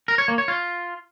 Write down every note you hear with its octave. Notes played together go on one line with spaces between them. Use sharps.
A#4
C#5
A#3
C#5
F4